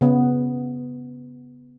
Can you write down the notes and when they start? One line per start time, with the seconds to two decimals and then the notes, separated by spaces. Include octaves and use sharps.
0.01 C#3 B3